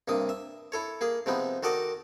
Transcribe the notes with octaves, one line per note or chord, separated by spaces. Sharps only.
G2 C3 A#3 D#6
E5
E4 A4 C#5
A#3 G#4
C3 F3 G#3 B3 D#4
D#3 F#4 A4 D5 D#5 A5